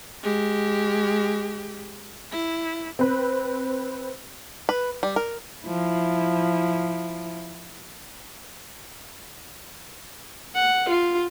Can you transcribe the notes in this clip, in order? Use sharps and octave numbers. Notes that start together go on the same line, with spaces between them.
G#3 G4
E4
C4 B4
B4
G3
A#4
F3 E4
F#5
F4